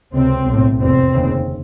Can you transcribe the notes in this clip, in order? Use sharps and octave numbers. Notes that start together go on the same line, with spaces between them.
C#2 C3 C4
B1 A2
F1 E2 B2 C4
F1 D#2 C#3